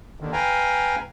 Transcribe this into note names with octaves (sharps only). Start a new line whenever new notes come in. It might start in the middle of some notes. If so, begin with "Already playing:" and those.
D#2 D3 D#3
B4 F5 G5 G#5 A#5